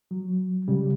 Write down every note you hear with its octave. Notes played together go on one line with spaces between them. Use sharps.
F#3
C#3 G3